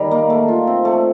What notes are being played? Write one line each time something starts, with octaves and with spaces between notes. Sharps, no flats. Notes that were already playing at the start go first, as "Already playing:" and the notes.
Already playing: D#3 G3
A#3
A3
F4
C4
A3